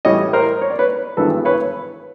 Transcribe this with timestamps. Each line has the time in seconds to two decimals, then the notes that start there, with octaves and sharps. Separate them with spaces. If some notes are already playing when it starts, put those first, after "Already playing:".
0.05 A2 E3 G3 C#5 D#5
0.33 A#4 C5
0.61 C#5
0.70 D5
0.79 B4 C#5
1.17 G#1 G2 E3 G#3 B3 A4 B4
1.45 B4 C#5